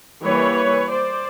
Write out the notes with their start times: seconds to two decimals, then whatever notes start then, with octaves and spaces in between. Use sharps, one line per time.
0.23 E3 G3 A#3 B4 C#5
0.89 C5 D5